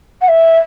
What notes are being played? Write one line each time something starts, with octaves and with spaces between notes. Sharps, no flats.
F#5
E5